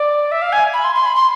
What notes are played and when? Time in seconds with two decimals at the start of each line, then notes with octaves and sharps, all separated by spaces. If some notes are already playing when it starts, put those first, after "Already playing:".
Already playing: D5
0.32 E5
0.42 F5
0.53 G#5
0.74 B5
0.84 C6
0.95 C6
1.06 B5
1.16 C6